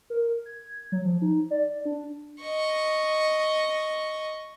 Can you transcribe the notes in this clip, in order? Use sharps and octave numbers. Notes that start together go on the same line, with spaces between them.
A#4
G#6
F#3
F3
D#4
D5
D4
D#5 C#6